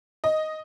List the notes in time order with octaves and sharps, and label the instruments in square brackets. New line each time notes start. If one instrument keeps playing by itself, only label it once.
[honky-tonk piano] D#5